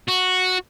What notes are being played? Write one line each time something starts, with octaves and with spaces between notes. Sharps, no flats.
F#4